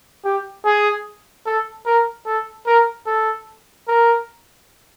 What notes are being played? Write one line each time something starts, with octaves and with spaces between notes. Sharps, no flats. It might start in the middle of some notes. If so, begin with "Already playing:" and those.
G4
G#4
A4
A#4
A4
A#4
A4
A#4